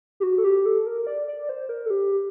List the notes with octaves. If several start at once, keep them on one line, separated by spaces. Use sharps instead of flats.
G4
F#4
A4
G4
A4
A#4
D5
D5
C5
A#4
A4
G4